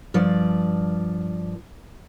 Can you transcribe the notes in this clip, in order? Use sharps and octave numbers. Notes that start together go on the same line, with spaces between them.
G2 F3 D5